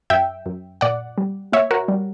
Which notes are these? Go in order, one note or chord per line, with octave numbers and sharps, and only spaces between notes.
F#2 E5 G5
F#2
A#2 D5 F#5
G3
A#2 C#5 E5
F#4 A#4
G3